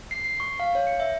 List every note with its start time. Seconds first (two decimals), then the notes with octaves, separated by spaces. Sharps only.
0.11 C7
0.24 C7
0.40 C#6
0.60 F5
0.75 C#5
0.87 C#7
1.00 E5